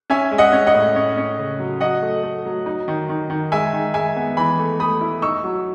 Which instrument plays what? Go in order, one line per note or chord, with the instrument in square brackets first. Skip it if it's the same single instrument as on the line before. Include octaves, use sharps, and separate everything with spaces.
[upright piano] C#4 E5 G#5
G#3
D#5 F#5
C#4
D#5 F#5
A2
C#4
C#4
C#3
F#3
F#3 D#5 F#5
A3
A3
F#3
D#4
D#3
D#3
D#3
G#3 E5 G#5
D#3
G#3 E5 G#5
B3
E3 G#5 B5
A3
A3 B5 D#6
E4
D#4 C#6 E6
F#3